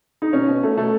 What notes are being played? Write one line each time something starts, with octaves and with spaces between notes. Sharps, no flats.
D#4
B2 C#4
B2
B2 A3
B2 A3